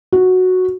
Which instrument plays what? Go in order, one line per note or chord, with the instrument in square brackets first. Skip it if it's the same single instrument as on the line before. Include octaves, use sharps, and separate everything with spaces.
[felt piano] F#4